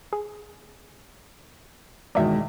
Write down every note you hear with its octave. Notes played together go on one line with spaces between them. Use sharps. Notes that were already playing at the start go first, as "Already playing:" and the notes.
G#4
E2 B2 D#3 G#3 D5 E5